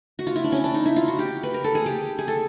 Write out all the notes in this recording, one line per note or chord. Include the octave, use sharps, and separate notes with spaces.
F#4
F4
E4
D4
C#4
D4
D#4
E4
F4
F#4
G4
B4
A#4
A4
G#4
G4
G#4
A4